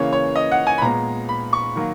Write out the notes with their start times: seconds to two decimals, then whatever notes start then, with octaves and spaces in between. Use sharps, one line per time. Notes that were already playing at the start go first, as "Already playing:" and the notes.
Already playing: C#3 E3 A#3 C#5
0.13 C#5
0.36 D#5
0.52 F#5
0.67 G#5
0.78 B5
0.82 A#2 G#3 B3 A#5
1.29 B5
1.53 C#6
1.76 D#3 F#3 A#3